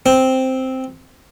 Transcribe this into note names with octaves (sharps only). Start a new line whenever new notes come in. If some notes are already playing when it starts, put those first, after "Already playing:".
C4